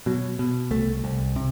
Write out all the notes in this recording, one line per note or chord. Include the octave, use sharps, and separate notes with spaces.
B2 F#3
B2
C2 A3
C2
C3